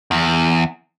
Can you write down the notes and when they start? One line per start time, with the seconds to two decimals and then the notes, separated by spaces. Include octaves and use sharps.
0.11 E2